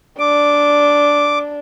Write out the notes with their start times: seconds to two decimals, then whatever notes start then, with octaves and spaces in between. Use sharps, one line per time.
0.19 D4 D6